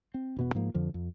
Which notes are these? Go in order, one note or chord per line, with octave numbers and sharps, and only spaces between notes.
C4
E1 B2 B3
G#2 F3 A#3
F2 D3 F3
F2